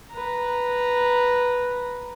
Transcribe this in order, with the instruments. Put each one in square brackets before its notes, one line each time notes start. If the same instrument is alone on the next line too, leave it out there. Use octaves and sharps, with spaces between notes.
[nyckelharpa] B4 A#5